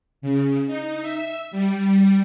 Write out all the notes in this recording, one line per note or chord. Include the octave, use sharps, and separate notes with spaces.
C#3
D#4
E5
G3